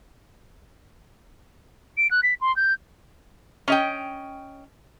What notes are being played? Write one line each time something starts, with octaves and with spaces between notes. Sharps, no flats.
D7
F#6
B6
C6
G6
C#4 D#5 G5